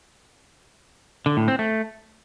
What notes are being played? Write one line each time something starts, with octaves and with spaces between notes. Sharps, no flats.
D3
A2
C4
A3